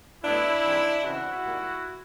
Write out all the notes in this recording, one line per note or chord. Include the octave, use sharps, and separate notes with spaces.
A2 F#3 B3 D4 E4
G#2 E3 G3 C4
C#3 E3 G#3 C4 E4 F#4
G#2 D#3 G3 A#3